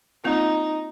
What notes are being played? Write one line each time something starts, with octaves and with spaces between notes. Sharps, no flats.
A#3 C4 D#4 F4